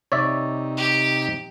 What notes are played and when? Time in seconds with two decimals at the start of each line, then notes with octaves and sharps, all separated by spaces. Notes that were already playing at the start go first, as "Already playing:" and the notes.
0.12 C3 D#4 C#5 D5 E5
0.77 G4